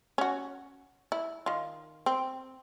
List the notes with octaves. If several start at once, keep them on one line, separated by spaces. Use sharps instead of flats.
C#4 F#4
E4
D#3 F4
C4